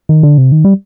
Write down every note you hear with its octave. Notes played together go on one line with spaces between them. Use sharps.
D#3
D3
C3
D#3
G3